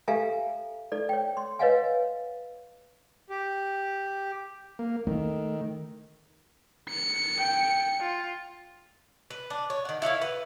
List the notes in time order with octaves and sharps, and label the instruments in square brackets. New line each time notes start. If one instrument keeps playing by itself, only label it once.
[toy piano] G4 A4 E5 F5 G#5 A#5
D#4 A4 D5
C#5 G5
C6
B4 C#5 D#5 F5 F#5 G#5
[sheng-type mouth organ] G4
[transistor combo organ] A#3
[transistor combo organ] D#3 [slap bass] A3
[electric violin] C#7
[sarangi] G5
F4
[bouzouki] B4
D4
C#5
D#3 F#5
E4 C#5 D#5 F5
B4